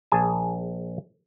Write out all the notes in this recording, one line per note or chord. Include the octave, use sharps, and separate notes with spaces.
A#1 G#4 G#5 A5